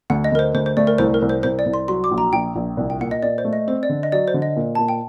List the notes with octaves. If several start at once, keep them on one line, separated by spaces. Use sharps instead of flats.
D2 F#5
D#5
D2 A#4
C5
D2 C5
C5
A3 D5
A#4
C2 C5
A#4
C2
C5
C2 C5
D5
C2
C6
F#3 C6
D6
A#1
A#5
A#1 G5
A#1
C2
G5
A#2 F#5
D#5
A#2 D5
C5
A3
D#5
C4 C5
D5
D3
D#5
F#3 D5
C5
D3
D#5
A#2
A#2 A5
G5